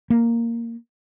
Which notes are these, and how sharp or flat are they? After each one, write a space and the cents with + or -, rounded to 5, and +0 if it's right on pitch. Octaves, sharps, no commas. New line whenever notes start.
A#3 -5